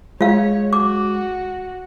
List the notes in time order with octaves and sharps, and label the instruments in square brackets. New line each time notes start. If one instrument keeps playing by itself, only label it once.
[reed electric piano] G#3 [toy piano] F4 F5 [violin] C#5
[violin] F#4 [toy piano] D6